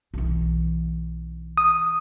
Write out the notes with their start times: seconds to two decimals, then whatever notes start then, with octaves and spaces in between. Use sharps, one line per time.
0.14 B1 E3
1.57 D#6